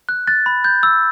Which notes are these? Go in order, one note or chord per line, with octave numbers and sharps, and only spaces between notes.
F#6
F#6 A6
B5
G6
E6